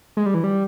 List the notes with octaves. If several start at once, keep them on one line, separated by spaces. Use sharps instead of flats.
G#3
G3
E3
G3